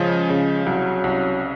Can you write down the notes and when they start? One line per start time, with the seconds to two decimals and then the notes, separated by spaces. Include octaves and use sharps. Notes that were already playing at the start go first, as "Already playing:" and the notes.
Already playing: C#3 F3 G#3
0.30 C#3
0.66 C2 F#3
1.04 C2